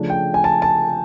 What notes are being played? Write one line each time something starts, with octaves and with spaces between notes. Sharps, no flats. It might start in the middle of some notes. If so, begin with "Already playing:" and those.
Already playing: C#3 F3 A3 D4
G5
G#5
A5
A5